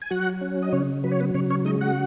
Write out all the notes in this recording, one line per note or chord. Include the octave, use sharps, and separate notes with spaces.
G#5
F#3 F#4 F#5
C#4
D#5
C#3 C#4 C#5
F#3 B4
C#5
B3 B4
C#3 C#4 C#5
C#4 C#5
G#3 D#4 D#5
F#4 F#5